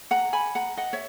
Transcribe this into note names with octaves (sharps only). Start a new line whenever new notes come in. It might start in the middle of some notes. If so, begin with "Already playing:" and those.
F#5 A#5
G#5 B5
F#5 A#5
D#5 F#5
C#5 E5